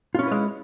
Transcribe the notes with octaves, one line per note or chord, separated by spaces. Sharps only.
G#3 C#4 E4 F4 B4